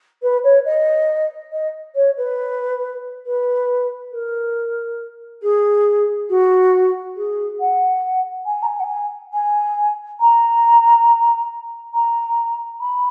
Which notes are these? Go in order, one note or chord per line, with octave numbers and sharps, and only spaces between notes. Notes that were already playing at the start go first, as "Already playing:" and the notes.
B4
C#5
D#5
D#5
C#5
B4
B4
A#4
G#4
F#4
G#4
F#5
G#5
A#5
G#5
F#5
G#5
G#5
A#5
A#5
B5